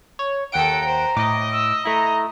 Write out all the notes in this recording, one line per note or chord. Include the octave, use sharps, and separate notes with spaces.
C#5
D#2 A4 F#5 G5 A#5 D7
C5
A2 D#5 D6
E6
A3 E4 A#5